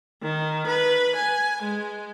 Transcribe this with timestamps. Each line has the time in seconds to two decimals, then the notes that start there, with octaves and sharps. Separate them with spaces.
0.23 D#3
0.67 B4
1.16 G#5
1.62 G#3